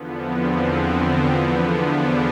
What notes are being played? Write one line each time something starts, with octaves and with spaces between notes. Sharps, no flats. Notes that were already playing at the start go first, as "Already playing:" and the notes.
Already playing: E2 D3 F3 B3
C4
B3
E2 D3 F3 B3
D4